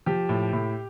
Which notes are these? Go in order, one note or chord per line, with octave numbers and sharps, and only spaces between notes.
F3 G4
A2
A2